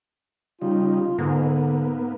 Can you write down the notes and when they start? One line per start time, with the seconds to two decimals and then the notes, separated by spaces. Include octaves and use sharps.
0.61 C#3 G3 D#4 F4
1.18 G#2 D3 A#3 B3